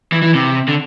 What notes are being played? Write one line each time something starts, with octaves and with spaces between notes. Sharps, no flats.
E3
E3
C3
D3